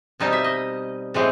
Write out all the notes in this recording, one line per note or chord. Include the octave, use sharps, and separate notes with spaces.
B2 G3 C4 D#4 D#5
E5
D#5
A2 E3 G#3 C4